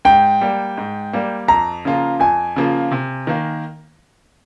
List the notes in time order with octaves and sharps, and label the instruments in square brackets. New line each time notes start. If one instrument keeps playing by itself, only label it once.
[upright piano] G#2 [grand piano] G5
[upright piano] G3 A#3
G#2
G3 A#3
[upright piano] F2 [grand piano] A#5
[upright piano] C#3 F3 A#3 F4
[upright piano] F2 [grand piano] G#5
[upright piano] C#3 F3 A#3 F4
C3
D#3 A#3